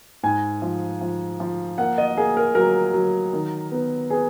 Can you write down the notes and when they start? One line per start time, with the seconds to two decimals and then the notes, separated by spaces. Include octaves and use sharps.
0.23 G#2 G#5
0.62 F3
1.01 F3
1.40 F3
1.78 A#3 F#5
1.98 D#5
2.17 A#3 G#4
2.37 A#4
2.55 F#3 A#4
2.94 F#3
3.33 D#3
3.72 B3
4.10 B3 G#4